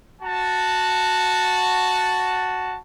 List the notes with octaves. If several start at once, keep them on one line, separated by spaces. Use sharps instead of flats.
F#4 A5